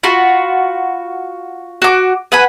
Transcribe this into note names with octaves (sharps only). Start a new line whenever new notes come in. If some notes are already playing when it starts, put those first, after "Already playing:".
F4 F#4 B5
F#4 D6
B4 F#5 G#5 B5